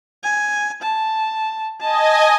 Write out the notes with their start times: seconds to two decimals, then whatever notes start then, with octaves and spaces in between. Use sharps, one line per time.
0.23 G#5
0.82 A5
1.80 D#5 G#5 A5